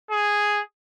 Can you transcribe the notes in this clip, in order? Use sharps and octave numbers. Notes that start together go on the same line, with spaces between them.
G#4